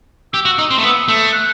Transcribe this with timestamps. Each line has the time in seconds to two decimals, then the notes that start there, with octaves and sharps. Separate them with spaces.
0.33 G4 E6
0.45 F#4
0.58 D#4
0.71 C4
0.78 A3
0.83 B3
1.08 A3
1.32 F#6